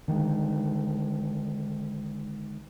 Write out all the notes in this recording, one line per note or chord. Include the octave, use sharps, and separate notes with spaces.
D3 D#3 G3 G#3